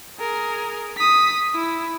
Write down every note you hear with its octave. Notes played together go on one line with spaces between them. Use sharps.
G#4 A#4
D#6 B6
E4